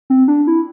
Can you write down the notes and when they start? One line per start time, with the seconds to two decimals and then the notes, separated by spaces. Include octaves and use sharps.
0.10 C4
0.28 D4
0.47 E4